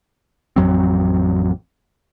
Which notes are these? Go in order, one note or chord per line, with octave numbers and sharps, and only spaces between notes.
A1 F2 F#3 C4